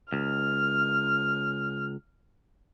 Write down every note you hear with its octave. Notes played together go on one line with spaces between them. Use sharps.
C#2 F6